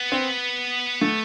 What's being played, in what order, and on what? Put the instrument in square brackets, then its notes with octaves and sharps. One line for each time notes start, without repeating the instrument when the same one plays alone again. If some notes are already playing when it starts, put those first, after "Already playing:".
Already playing: [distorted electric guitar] B3
[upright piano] C4
A3